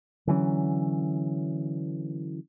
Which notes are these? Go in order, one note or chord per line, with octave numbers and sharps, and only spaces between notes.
D3 E3 F#3 C#4